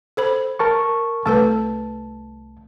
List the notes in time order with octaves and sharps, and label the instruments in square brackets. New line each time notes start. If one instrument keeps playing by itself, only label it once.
[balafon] A4 C5 B5
[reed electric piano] A#4 A5 C#6
[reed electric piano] C2 A5 [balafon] A3 A4 B4